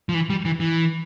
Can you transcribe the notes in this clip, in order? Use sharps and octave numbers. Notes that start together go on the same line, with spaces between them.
F3
E3
G3
E3
E3